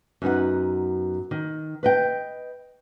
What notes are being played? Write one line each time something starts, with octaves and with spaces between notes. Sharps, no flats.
F#2 B3 D#4 F#5
D#3
B4 D#5 G5